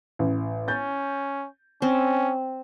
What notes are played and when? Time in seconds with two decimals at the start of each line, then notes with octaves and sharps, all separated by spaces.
0.19 A1
0.68 C#4 G6 A6
1.82 C4 C#4